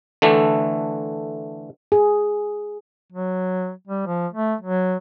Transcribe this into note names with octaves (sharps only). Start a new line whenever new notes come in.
D3 E3 A3
G#4
F#3
G3
F3
A3
F#3